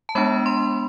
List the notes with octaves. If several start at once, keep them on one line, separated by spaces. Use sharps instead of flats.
A5
G#3 B3 D4 B5
C6